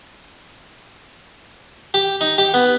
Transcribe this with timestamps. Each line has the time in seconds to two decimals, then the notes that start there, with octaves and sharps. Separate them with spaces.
1.94 G4
2.21 D#4
2.38 G4
2.54 B3